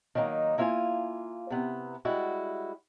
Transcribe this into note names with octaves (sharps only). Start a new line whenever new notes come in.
D#3 F#3 A#3 D4 D#4
A#3 E4 F4 D#5 F5 G#5
C3 B3 E4
G3 G#3 E4 F#4